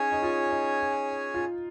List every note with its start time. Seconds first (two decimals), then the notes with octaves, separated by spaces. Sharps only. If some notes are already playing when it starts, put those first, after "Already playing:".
Already playing: C#4 D#4 G#4 C#5 G#5
0.12 D#4
0.23 F4
0.51 D#4
1.34 F4